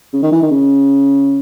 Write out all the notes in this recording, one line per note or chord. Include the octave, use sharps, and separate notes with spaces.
C#3
D#3
E3
D#3
C#3